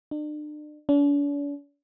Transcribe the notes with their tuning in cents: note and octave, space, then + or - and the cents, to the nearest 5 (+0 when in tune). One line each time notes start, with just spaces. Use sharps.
D4 +40
D4 -45